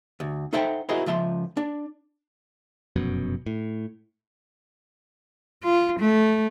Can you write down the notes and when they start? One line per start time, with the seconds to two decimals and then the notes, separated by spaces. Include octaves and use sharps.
0.20 D2
0.53 D#4 A4 C5 E5 F#5 G5
0.89 E4 F#4 G#4 A#4 C5 D#5
1.06 C#2 F3 E5 C6
1.57 D4
2.96 F1 F#2 B2
3.46 A2
5.63 F4
6.00 A3